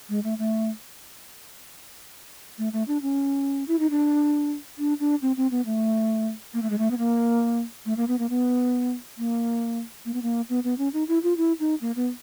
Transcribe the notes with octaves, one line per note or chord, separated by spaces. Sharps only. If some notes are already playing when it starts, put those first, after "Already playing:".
G#3
A3
A3
A3
A3
D4
C#4
E4
D#4
D4
D4
D4
C4
C4
B3
A3
A#3
A3
G#3
A3
B3
A#3
A3
A#3
B3
A#3
B3
A#3
A#3
B3
A#3
B3
B3
C#4
D#4
E4
F4
E4
D#4
A#3
B3